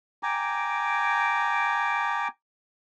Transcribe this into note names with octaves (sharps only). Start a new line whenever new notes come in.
G5 G#5 A#5 D6